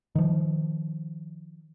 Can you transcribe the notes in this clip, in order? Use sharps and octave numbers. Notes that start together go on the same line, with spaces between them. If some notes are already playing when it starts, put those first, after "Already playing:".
D#3 F3